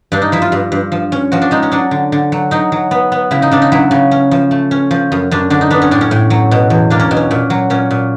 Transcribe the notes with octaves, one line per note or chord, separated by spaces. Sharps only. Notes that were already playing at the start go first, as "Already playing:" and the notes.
G2 D4
D#4
F3 E4
F4
G2
G2
F3
C#4
F3 F#4
D4
G#3 D#4
C#4
F#3 D4
D3
D3
F#3
F#3 D#4
F#3
B3
B3
C#3 E4
D#4
C#3 D4
D#4
F#3 E4
C#3
C#4
F3
A3
C#4
F3
F#2
F#2 D4
D3 D4
D#4
B3 D4
C#4
A2 D4
C#4
A2
F#3
B2
E2
A#3 D4
C#4
B2
C#4
A#2
F#3
A#2 C#4
A#2